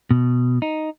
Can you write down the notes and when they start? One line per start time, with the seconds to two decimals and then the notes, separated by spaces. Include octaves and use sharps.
0.11 B2
0.62 D#4